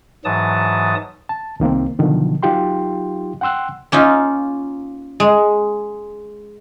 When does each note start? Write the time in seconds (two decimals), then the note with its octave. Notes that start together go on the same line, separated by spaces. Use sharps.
0.25 G#2 E3 F#3 A5 D#6
1.29 A5
1.60 C2 D#3 A#3 C4
1.99 B2 D3 D#3 F3 F#3
2.43 F#3 D#4 F4 G4 G5 C6
3.41 F#5 G5 C6 E6 F#6
3.92 A#3 C#4 D#4 F4
5.20 G#3